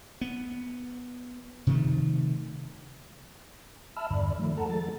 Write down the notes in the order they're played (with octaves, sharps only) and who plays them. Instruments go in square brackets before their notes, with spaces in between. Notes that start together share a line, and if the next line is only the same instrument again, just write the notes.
[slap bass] B3
C3 D#3 F3 A3
[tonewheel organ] E5 A5 B5 E6 F6
E2 G2 D3 D5 B5
D#3 F3 A3
A4 F#5 A5 A#5
F3 G#3 A4 A6